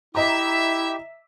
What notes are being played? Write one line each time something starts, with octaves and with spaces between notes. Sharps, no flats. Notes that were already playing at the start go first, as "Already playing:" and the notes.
E4 G4 D#5 E5 A#5 D6